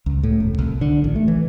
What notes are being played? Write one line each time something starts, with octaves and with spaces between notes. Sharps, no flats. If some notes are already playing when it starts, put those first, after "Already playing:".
C#2
A2
E1
C2
D3
A1
A3
E3